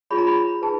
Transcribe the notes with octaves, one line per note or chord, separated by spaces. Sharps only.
F4 G#4 C#5 B5
A#5
B5
D#4 G#4 B4 A5